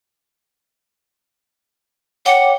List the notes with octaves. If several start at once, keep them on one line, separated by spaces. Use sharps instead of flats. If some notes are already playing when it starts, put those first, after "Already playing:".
C#5 F#5 G5 D6